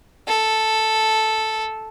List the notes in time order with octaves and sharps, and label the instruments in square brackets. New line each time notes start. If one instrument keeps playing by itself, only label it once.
[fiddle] A4